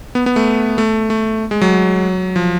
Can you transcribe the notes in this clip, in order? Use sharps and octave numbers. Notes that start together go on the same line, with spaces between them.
B3
B3
A3
A3
A3
G#3
F#3
F3